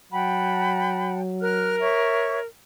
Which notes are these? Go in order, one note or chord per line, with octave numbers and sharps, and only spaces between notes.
F#3 F#5 G5 A5 B5
A#4 F6 F#6
C#5 E5 C#6